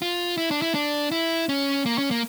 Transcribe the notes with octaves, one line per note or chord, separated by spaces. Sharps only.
F4
E4
D4
E4
D4
E4
C#4
A#3
C#4
A#3